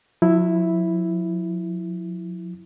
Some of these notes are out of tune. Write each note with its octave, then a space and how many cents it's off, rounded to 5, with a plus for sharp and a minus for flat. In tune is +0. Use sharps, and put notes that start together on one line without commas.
F3 +45 E4 +0